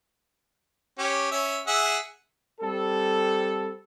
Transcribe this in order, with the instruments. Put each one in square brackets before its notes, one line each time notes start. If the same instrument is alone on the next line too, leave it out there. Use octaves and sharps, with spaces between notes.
[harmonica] C#4 G4
C#4 E5
G#4 E5 F#5
[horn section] G3 C4 A4